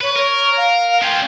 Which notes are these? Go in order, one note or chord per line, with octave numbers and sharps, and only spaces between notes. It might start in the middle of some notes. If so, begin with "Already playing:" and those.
B4 C#5
A#4 C#5
F5
C#4 F4 G5